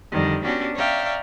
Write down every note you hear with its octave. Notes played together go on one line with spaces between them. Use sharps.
F2 D3 D#3 G3
B3 C#4 D4 F#4 G4
C#5 D5 E5 F5 G5 A#5